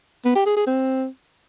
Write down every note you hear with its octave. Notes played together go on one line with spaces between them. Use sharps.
B3
G4
G#4
G#4
C4